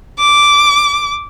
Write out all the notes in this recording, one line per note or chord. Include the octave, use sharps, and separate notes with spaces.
D6